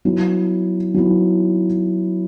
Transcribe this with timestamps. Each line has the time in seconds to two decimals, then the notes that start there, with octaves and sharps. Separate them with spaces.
0.05 F#3 B3 E4
0.94 F#3 B3 E4